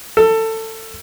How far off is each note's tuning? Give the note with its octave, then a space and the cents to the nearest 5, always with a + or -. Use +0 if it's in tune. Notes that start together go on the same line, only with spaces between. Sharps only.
A4 +20